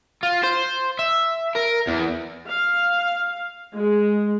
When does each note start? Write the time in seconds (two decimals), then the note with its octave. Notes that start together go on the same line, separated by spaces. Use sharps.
0.23 F4
0.44 C5
0.99 E5
1.56 A#4
1.88 E2
2.46 F5
3.74 G#3